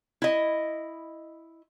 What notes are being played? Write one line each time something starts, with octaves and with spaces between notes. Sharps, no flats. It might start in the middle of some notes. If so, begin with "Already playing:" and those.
E4 D#5